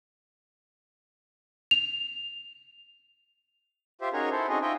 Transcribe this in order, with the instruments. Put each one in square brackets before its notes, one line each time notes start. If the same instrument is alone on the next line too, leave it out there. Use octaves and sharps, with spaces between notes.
[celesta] F7
[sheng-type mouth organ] F4 G4 C5 E5
C#4 D#4 F#4 G#4 A#4 C#5
E4 A4 C5
C4 C#4 D#4 F#4 G#4 D#5
D#4 F4 D#5 E5 G5